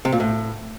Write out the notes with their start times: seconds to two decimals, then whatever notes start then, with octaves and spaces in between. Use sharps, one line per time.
0.05 C3
0.12 A#2
0.20 A2